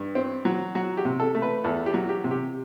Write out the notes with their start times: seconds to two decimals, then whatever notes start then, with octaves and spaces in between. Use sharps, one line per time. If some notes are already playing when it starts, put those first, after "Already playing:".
Already playing: G2
0.15 C4
0.45 F#3
0.75 F#3 F#4
0.97 G4
1.05 C3
1.20 A4
1.35 A3
1.42 B4
1.64 E2 A4
1.86 G4
1.94 F#3
2.09 G4
2.24 C3
2.31 G4